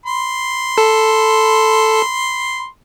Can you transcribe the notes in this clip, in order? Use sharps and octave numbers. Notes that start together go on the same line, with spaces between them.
B5 C6
A4